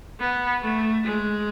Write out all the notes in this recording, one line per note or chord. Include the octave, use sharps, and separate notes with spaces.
B3
A3
G#3